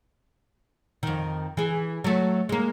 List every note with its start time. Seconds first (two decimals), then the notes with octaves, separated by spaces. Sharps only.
1.03 F2 D#3
1.57 E3 G#4
2.04 F#3 A3
2.49 G#3 A#3